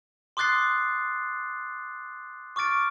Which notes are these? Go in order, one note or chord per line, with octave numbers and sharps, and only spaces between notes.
C6 D6 D#6 F#6 A6 C7
C#6 D6 F6 A6 D7